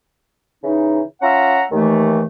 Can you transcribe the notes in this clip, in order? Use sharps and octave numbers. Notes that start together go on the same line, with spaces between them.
C#3 E3 D#4
C#4 F4 E5 F#5 A#5
D#2 D#3 E3 A3